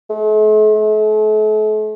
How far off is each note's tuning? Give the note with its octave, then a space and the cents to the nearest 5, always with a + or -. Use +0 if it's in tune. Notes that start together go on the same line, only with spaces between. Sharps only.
A3 -45
A3 -40